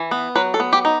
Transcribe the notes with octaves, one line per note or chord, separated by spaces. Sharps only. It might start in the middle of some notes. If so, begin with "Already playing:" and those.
Already playing: E3
B3
F#3 B4
A4
B3
G4
D#4